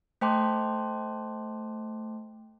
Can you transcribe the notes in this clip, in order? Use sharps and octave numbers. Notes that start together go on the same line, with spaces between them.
A3 C5 G5 A5 C6 D6